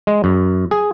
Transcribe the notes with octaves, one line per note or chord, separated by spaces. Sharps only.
G#3
F#2
G#4